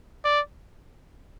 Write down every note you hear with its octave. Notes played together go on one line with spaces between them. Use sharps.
D5